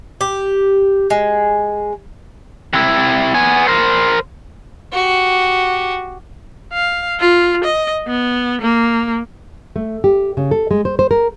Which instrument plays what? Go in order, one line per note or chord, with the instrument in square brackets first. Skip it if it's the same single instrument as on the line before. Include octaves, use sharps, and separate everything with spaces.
[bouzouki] G4
G#3
[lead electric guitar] C3 E4
B3 G#5
A#4 C5
[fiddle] F#4 G4
[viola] F5
F4
D#5
B3
A#3
[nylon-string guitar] A3
G4
C#3
A4
G#3
C5
C5
A#4